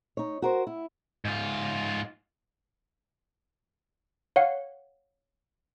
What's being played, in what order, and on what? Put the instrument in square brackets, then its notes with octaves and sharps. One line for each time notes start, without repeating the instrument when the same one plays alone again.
[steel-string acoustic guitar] D#4 C#5
F#4 A#4 C5
E4
[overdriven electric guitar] G#2 F4
[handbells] C#5 F5 F#5